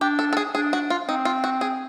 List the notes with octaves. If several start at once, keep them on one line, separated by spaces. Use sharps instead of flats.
D4 G4
A4
A4
G#4
D4 G#4
F#4
F4
C4 D#4
F4
F#4
G#4